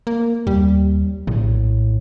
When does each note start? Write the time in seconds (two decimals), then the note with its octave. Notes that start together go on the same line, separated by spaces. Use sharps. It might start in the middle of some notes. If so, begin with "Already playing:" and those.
0.07 A#3
0.47 D#2 G3
1.27 A#1 A2